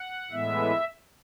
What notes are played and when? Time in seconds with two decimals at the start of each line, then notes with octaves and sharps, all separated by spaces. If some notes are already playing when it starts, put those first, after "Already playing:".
Already playing: F#5
0.31 A2 E3 G#3 B3 E5